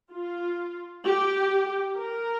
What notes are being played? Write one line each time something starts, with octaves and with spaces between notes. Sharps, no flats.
F4
G4
A#4